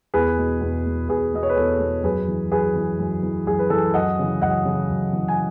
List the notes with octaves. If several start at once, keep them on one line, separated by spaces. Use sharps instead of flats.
E2 G#4 B4
B2
E2
B2
E2 G#4 B4
B2 D#5
C#5
B4
E2 A4
B2
F#2 G#4 B4
E3
F#2 G#4 B4
E3
F#2
E3
F#2 G#4
B4
E3 A4
F#2 D#5 F#5
C#3 E3
F#2 D#5 F#5
C#3 E3
F#2
C#3 E3
G#5